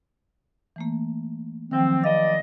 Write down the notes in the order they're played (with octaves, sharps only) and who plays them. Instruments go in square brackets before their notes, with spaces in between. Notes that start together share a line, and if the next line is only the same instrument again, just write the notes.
[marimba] E3 A3 A#3
[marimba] D#3 F3 F#3 [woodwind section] C4
[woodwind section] G2 D5 D#5 [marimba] F5